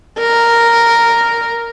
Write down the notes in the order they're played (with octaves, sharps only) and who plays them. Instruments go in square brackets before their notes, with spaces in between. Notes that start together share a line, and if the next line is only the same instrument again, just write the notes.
[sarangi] A#4